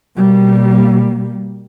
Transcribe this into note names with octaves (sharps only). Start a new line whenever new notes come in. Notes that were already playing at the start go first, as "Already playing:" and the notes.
B2 G3 A#3